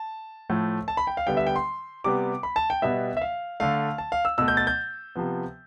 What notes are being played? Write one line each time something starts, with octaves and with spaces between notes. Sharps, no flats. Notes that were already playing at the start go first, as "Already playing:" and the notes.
Already playing: A5
A2 F3 A3
A5
B5
G5
F5
D3 G3 B3 G5
E5
G5
C6
C3 G3 B3 D6
B5
A5
G5
B2 G3 B3 E5
E5
F5
D3 A3 F5
A5
F5
E6
B2 A3 E6
G6
A6
G6
C3 F3 B3